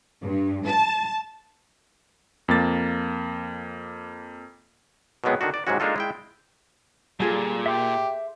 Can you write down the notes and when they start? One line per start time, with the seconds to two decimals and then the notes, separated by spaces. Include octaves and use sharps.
0.23 G2
0.67 A5
2.48 F2 A#3 A6
5.24 B2 D#3 F#3 G#3 B3 C4
5.41 D3 D#3 D4 F#4
5.54 D5
5.67 G#2 C3 F#3 G#3 C#4 F#4
5.80 G#3 A#3 D4 D#4 F4 A4
5.96 G#3 E4 G5
7.20 A#2 G3 F4 G#4 A4
7.66 G4 E5 C6 G6